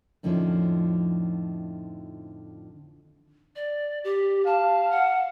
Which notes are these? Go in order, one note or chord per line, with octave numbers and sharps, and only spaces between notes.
F2 A2 D3 D#3 F3 C#4
D5
G4
F5 A5
F#5